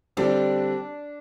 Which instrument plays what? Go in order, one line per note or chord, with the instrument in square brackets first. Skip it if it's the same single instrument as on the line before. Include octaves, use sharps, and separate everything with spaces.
[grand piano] D3 G3 C4 G4 [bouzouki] D4